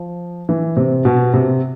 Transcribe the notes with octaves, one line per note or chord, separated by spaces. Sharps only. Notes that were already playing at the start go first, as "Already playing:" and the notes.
Already playing: F3
E3
C3
B2
C3